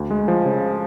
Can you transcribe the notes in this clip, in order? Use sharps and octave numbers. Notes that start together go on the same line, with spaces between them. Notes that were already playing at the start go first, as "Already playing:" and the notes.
Already playing: D2
G#3
F3
C#3